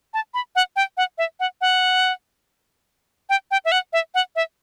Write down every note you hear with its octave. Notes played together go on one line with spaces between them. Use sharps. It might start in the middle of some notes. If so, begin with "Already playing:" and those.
A5
B5
F#5
G5
F#5
E5
F#5
F#5
G5
G5
E5
F#5
E5
F#5
E5